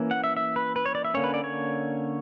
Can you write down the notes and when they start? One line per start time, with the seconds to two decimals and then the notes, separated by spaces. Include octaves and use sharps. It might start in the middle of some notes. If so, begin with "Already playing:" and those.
Already playing: E3 A#3 C#4
0.11 F#5
0.24 E5
0.37 E5
0.56 B4
0.76 B4
0.86 C#5
0.95 D5
1.05 E5
1.14 D3 A#3 C#4 C#5
1.24 B4
1.34 D5
1.44 C#5